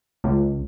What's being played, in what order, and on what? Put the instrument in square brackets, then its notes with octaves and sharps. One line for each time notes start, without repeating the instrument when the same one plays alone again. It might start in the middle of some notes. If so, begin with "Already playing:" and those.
[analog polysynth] C#2